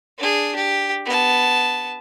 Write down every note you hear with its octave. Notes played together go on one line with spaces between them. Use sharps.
D4 G#4
G4
B3 A5